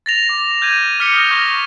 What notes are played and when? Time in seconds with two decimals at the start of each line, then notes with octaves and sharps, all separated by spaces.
0.06 A6 A#6 F7
0.29 D6
0.61 F6 G6 G#6 D#7
0.99 D6 F6 B6 C#7 G7
1.14 D#6 F6 A#6
1.31 C#6 G6 A#6